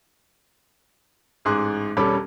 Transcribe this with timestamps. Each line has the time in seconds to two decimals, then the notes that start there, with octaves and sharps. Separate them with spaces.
1.45 A1 G#2 G#4 C6 D6 F#6
1.97 E1 G3 C#4 A4 B5 D6